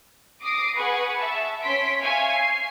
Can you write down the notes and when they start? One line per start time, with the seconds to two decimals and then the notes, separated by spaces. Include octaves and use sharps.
0.41 D6 D#6 A#6 C7 D7
0.77 G#4 B4 F#5 G#5 C#6
1.16 E5 A5
1.63 C#4 C6 B6 D7
2.01 E5 F5 G#5 C#6
2.34 C7